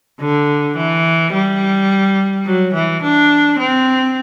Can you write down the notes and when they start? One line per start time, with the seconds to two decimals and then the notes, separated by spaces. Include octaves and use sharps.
0.21 D3
0.77 E3
1.34 G3
2.46 F#3
2.74 E3
3.02 D4
3.59 C4